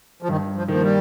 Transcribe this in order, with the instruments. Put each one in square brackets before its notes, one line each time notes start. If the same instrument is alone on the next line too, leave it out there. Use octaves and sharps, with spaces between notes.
[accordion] F3
[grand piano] G2 [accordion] D#3
[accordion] F3
[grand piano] D#3 A#3 [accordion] F3
[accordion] G3